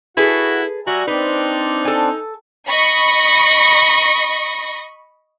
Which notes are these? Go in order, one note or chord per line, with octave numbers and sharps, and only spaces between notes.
E4 F#4 G#4 A4 B4 F#5
G3 F#4 E5 G#5 A#5
C4 D4 D#4 B4 D5
A4 G#5
D#5 B5 C#6 A#6 C#7